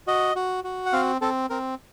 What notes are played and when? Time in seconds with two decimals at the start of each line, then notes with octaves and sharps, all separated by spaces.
0.07 F#4 D#5
0.36 F#4
0.64 F#4
0.86 F#5
0.93 C4 F5
1.21 C4 A4
1.50 C4 A#4